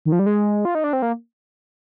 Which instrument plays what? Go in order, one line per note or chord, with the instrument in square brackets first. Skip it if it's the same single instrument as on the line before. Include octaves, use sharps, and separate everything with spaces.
[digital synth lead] D#3
F3
G3
G#3
F4
D#4
D4
C4
A#3